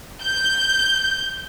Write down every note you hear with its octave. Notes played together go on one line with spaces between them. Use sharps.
G6